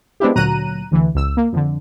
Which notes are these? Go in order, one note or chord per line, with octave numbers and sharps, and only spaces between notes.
G#3 B3 C4 D4 E4 G4
D2 A#2 F#3 A#5 F#6 D#7
D2 D3 E3
C#2 E6
A#3
F2 D3